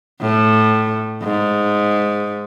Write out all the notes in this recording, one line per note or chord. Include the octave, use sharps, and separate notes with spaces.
A2
G#2